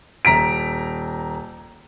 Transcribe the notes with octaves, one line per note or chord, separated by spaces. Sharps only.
D#1 A#5 B6 D7